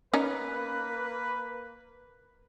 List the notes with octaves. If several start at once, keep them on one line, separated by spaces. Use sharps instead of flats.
A#3 C#4 D#4 A#4 B4